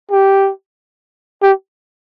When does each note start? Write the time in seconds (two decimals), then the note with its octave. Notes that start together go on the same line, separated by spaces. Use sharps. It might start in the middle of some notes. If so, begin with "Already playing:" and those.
0.11 G4
1.42 G4